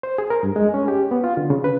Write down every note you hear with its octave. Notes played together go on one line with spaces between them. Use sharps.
C5
G#4
A#4
G2
G#3
C#4
G4
B3
F4
D3
C#3
B4